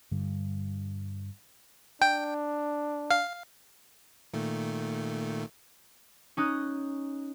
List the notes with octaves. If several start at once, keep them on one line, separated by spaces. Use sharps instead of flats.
G2 D3 G3
D4 G5
F5
A#2 D#3 A3
C#4 D#4 D#6 F#6